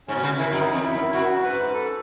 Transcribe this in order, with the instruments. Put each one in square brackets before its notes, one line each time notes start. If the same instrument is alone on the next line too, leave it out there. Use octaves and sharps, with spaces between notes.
[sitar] G#2 [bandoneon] C#4
[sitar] B2
C#3
[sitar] D#3 [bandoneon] E4
[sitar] F#2 [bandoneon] D#4
[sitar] E2
[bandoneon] E4
[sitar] F#2
[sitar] F#2 [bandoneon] F#4
[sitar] G#2 [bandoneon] B4
[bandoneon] A4